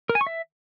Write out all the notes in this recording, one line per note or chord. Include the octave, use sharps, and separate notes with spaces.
A#4
G#5
C#6
E5